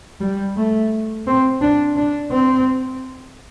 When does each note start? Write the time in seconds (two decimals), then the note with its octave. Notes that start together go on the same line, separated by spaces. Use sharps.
0.21 G3
0.57 A3
1.27 C4
1.62 D4
1.97 D4
2.31 C4